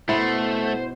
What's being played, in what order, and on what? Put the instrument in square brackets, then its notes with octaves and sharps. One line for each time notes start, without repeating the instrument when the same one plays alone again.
[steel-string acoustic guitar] B2 F#5 [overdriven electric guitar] A3 [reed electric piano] E4 [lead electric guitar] C5